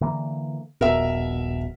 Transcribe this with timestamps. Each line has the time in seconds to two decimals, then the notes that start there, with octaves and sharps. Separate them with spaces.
0.01 D3 E3 A#3
0.81 D#1 A#1 B2 A#4 E5